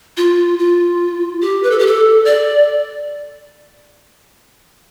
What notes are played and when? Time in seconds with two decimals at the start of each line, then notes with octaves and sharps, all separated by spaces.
0.17 F4
0.59 F4
1.41 G4
1.63 B4
1.71 A4
1.79 G4
1.86 A4
2.25 D5